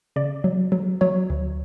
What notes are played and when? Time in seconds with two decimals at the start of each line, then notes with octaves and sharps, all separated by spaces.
0.16 C#3 D5
0.44 F#3
0.72 F#3
1.01 F#3 C#5
1.30 D2